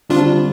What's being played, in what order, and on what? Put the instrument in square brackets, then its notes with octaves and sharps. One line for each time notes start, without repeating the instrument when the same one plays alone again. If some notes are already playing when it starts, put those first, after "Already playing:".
[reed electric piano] D3 G3 C4 [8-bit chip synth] D4 F4